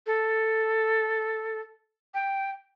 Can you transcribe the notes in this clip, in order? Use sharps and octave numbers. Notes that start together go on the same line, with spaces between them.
A4
G5